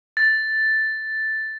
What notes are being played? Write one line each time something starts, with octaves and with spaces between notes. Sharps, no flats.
A6